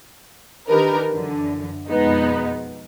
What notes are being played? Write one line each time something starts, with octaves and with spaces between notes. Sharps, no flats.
D#3 D4 D#4 G4 A#4 B4
F#2 D3 E3
F2 B2 G#3 B3 D#4